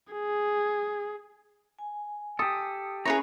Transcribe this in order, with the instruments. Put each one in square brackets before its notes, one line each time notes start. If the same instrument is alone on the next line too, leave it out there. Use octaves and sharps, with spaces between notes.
[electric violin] G#4
[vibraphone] G#5
[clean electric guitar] G4 A4 [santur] D#6
[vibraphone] C#4 [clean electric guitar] E4 A#5 [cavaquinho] G#4 B4 C#5